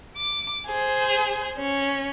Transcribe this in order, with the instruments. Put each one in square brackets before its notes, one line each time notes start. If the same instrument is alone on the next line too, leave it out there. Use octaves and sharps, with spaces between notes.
[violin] D6
G#4 C5
C#4